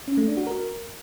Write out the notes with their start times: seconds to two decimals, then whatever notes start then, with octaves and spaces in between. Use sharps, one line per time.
0.08 C#4
0.17 A3
0.27 D4
0.37 F#4
0.47 A#4